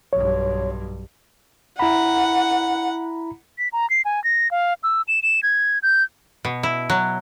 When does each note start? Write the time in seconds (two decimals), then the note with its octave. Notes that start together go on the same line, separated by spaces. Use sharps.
0.13 B1 G2 C#5
1.80 E4 F#5 A#5 B5
3.58 B6
3.73 A#5
3.90 C7
4.05 G#5
4.24 A#6
4.51 F5
4.83 E6
5.08 E7
5.23 E7
5.43 G#6
5.83 G6
6.45 B2
6.63 E4
6.90 F#3